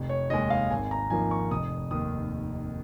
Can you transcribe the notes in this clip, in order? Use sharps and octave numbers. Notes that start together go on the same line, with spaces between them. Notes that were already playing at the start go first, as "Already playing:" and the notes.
Already playing: F1
C#5
D#2 D#3 G#3 D#5
F5
G#1 G#5
A#5
G#2 F3 A#3 G#5
C#6
F1 D#6
D#2 D#3 D#6